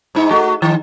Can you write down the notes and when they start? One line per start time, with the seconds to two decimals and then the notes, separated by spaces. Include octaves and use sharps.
0.15 G#2 D#4
0.30 A3 F#4
0.62 D#3